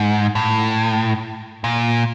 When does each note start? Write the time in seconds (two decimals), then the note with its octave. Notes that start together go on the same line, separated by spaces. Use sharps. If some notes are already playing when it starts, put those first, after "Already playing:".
Already playing: G#2
0.35 A2
1.64 A#2